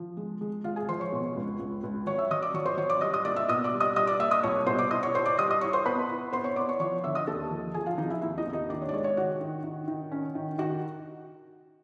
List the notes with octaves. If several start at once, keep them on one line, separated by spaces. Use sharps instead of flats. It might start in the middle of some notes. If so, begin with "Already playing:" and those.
Already playing: F3
G#3
G#3
G#3 F4 F5
G#4 G#5
F3 C5 C6
C#5 C#6
B2
C#2
C#2
C#2
F#3 C#5 C#6
E5 E6
F#3 D#5 D#6
D5 D6
F#3 C#5 C#6
C5 C6
F#3 C#5 C#6
D5 D6
G3 D#5 D#6
D#5 D#6
A#3 D5 D6
E5 E6
B2 D#5 D#6
D5 D6
G3
D#5 D#6
G3 D#5 D#6
D5 D6
A#3 E5 E6
D#5 D#6
C2 C#5 C#6
B2 C5 C6
D5 D6
E4 D#5 D#6
C#5 C#6
E4 C5 C6
D5 D6
G3 D#5 D#6
D#5 D#6
E4 C#5 C#6
C5 C6
B3 B4 B5
E4
B3 C5 C6
C#5 C#6
B3 D5 D6
C#5 C#6
F3 C#5 C#6
D3 E5 E6
D#5 D#6
D#2 A4 A5
F3
F3 G#4 G#5
F4 F5
F3 D#4 D#5
E4 E5
D#2 E4 E5
D#4 D#5
D#2
D#4 D#5
D#3 D4 D5
C#5
D5
G#3 C#5
C#5
D#3 F#4 F#5
D#3
D#3
D#3
C#4
D#3
D#3 F#4 F#5